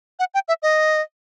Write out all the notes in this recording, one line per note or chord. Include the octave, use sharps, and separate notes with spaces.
F#5
G5
E5
D#5